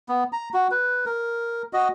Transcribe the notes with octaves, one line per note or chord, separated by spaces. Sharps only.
B3
A#5
F#4
B4
A#4
F#4 D#5